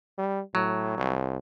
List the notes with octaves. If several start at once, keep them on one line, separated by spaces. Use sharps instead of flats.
G3
A2 F#3
C2